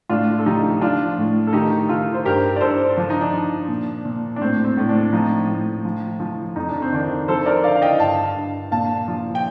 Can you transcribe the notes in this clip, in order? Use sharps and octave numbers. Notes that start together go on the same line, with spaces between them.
A2 D4 F4
A4
F3 D#4 G4
F3 D4 F4
A2
A4
D#3 D#4 G4
D#3 F4 A4
C5
G2 G4 A#4
D5
G2 A4 C5
F3 D4
D#4
D4
F3
A#2
A#2
D4
A2 C4
C4
A2
D4
F3 C4 D#4
A2
F3
F3
F2 D#4
D4
C4
D#3 D4
F3 A4 C5
A#4 D5
D3 D5 F5
F5
D#5 G5
G2 F5 A5
G2
A#2 F5 A5
F3
G5